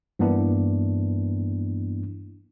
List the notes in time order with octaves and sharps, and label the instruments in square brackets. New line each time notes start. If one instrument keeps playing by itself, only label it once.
[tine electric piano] G2 E3 A#3 B3 D4 E4